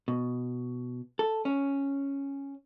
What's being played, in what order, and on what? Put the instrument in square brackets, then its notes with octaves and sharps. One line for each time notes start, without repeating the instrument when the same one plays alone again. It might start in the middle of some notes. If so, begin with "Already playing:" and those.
[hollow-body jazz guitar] B2
A4
C#4